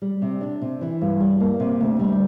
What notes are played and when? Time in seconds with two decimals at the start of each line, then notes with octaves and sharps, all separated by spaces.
0.02 G3
0.22 C3
0.41 D4
0.62 C3
0.81 E3
1.01 G2
1.20 G3
1.40 A#3
1.60 C3
1.81 D2
1.99 G3